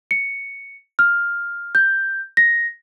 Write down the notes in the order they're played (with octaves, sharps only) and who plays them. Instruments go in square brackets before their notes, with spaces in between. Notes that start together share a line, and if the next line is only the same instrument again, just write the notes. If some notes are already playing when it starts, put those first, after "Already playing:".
[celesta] C#7
F6
G6
A#6